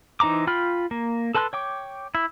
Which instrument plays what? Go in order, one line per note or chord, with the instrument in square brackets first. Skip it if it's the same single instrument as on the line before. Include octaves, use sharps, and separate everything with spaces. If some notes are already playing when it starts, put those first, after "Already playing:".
[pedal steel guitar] E3 D#4 C5 A#5 D6
F4 G5 B5 F6
A#3
A4 B4 A5 C6 F#6
C#5 G5 D6
E4